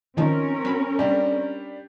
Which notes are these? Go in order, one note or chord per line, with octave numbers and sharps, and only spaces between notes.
D#3 F3 C4 C#4 D#4 A#4
F#3 B5
G3 D4 G4